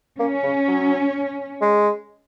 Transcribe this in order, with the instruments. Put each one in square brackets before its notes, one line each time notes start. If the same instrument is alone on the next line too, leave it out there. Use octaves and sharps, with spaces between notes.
[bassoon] A#3 [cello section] C#4
[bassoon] C#3
F#3
G#3